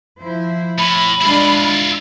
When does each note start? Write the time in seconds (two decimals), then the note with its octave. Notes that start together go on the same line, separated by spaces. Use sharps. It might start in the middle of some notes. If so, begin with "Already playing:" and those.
0.21 F3 E4 C5
0.78 A2 B5
1.21 G#3 D4 E4 F4